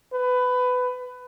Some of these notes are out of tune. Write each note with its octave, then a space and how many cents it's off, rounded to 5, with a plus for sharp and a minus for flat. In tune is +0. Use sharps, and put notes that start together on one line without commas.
B4 +20